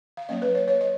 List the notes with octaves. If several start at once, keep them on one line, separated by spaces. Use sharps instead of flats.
F5
F#3 A#3 C#4 D#5
B4
C#5
C#5
D#5